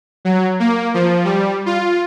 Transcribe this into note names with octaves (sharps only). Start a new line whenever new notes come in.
F#3
A#3
F3
G3
F4